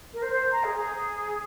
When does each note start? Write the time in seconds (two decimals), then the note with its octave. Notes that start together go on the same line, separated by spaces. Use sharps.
0.13 A#4
0.22 C5
0.32 C5
0.51 A#5
0.64 G#4
0.77 G#4